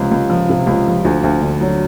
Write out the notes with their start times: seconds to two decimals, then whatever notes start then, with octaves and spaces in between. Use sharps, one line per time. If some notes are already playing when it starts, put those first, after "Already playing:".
Already playing: C#2 C3 F3
0.11 C#2
0.30 F3
0.49 C3
0.67 C#2
0.87 F3
1.05 D2
1.23 D2
1.42 D3
1.61 F#3